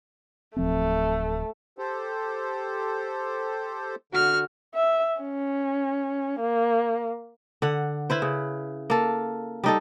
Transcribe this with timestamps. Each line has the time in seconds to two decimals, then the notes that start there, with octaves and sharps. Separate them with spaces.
0.57 D1 F3 A3 C4
1.78 G4 A4 C5
4.13 D3 F#4 F6
4.75 E5
5.22 C#4
6.40 A#3
7.62 D3 F#5
8.10 E4 B4 C5
8.22 C#3
8.90 A#3 A4
9.64 G3 D#4 A4